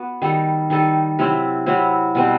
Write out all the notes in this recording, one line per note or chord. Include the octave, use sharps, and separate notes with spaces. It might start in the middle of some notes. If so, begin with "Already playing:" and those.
Already playing: B3 F#4
D#3 G3 D#4 A4
D#3 G3 D#4 A4
C3 F#3 C4 E4
C3 F#3 C4 E4
B2 G3 C4